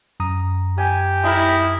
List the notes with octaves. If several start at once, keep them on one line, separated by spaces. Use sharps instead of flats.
F#2 A#5 D#6
G4 G#5
D#4 E4 A#4